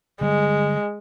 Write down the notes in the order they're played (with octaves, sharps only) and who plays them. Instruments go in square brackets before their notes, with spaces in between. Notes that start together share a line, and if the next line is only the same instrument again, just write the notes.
[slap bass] D3 G3 [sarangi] G#3